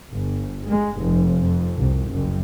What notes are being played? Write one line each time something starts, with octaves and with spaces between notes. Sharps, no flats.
G1
G#3
F1
F2
C2
F#1